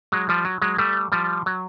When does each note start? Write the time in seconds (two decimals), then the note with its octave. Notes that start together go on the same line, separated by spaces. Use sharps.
0.12 F#3 G#3
0.29 F3 G3
0.45 F#3
0.62 F#3 G#3
0.78 G3 A3
1.12 F3 G3
1.46 F#3